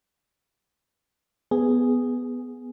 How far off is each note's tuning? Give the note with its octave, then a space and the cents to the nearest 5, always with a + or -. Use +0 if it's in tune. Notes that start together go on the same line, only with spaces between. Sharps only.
B3 +0 G#4 +0